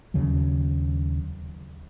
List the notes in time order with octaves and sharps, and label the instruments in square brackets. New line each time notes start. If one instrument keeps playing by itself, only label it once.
[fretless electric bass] D#2 C#3 F#3